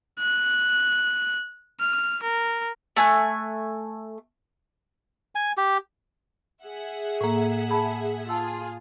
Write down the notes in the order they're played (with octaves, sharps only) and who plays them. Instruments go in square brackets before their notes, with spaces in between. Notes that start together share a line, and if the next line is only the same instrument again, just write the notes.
[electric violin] F#6
F6
A#4
[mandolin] A3 G#5 F#6
[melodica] G#5
G4
[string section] G#4 E5 F#5
[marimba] A2 A#3
A5 B5
[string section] F4 G#4 [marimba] A5 E6